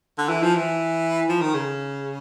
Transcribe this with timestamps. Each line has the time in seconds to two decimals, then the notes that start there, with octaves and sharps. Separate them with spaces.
0.18 D3
0.29 E3
0.43 F3
0.55 E3
1.29 F3
1.41 D#3
1.54 C#3